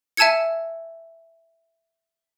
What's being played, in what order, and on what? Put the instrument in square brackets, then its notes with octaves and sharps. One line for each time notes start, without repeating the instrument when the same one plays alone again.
[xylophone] E5 G#5 A5 E6 G#6 C#7